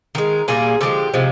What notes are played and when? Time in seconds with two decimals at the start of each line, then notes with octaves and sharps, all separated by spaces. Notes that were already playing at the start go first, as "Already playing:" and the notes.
0.15 D#3 G#3 A#4
0.48 A#2 G3 A#3 G#4
0.81 D3 F3 G#3 G4
1.14 C3 F3 G#3